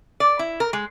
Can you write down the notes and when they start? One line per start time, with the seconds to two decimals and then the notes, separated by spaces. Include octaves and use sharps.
0.20 D5
0.39 E4
0.60 A#4
0.73 G#3